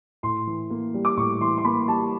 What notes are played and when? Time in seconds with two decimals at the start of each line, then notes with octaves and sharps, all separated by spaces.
0.23 A2 C6
0.47 E3
0.70 A#3
0.94 G3
1.05 D6
1.17 A2 C#6
1.41 E3 C6
1.58 C6
1.65 A#3 B5
1.88 G3 A5